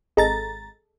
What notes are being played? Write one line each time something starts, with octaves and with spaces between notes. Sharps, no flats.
G#1 G#4 A4 D#5 A#5 A6